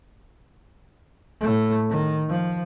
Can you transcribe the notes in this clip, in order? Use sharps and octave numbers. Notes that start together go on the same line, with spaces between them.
A2 A3
D#3
F3